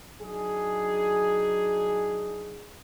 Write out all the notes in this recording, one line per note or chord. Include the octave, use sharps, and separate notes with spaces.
F#3 D4 D#4 G#4